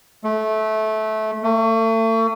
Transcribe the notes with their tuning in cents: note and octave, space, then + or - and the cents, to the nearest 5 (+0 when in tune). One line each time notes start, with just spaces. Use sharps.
A3 -20
A3 +40